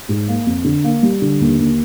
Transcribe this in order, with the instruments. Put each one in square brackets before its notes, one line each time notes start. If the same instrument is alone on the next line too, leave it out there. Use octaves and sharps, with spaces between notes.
[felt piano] G#2
A#3
F2
D3
A#3
G3
D3
D#2
D#2